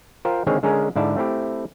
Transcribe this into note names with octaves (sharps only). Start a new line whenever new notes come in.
F4 A#4 C5 G5
D3 D#3 G#3 C4 G#4 C#5
D3 G#3 C#4 G#4 A#4
G#2 D3 E4 D5 A5
A3 C4 E4 G4